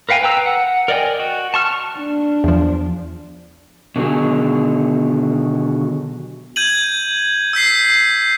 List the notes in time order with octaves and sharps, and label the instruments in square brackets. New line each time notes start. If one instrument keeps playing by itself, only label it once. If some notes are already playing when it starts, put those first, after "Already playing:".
[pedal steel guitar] A#4 B4 F5 G5 G#5
B4 G5 A#5 E6
F#5
A#4 D5 D#5 G5 G#5
F#4
A5 C#6 F6
[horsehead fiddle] D4
[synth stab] E2 F3
[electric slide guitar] B2 D3 D#3 F#3 G#4
[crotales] G6 G#6 D#7 F#7
E6 G6 B6 C7